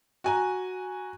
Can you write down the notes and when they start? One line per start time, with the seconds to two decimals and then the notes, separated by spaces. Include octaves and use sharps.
0.24 F#4 G#5 A#5